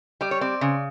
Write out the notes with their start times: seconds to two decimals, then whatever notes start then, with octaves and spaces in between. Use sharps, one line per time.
0.21 G3 D5
0.31 C#5
0.41 C4 D5
0.61 C#3